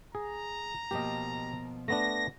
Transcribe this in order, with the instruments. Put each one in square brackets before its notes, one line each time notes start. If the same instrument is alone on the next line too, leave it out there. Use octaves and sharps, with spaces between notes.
[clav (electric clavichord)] G#4 [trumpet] A#5
[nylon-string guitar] B2 F3 A#3 [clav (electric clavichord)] G4 D#5
[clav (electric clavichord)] A3 B3 D4 [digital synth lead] A#6